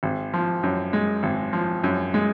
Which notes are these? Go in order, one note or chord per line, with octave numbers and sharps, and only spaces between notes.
G#1
F3
F#2
G#3
G#1
F3
F#2
G#3